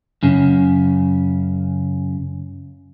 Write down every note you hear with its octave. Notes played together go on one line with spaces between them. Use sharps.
F#2 C#3